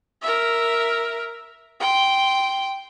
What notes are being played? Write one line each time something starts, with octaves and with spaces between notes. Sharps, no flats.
A#4 E5
G5 C6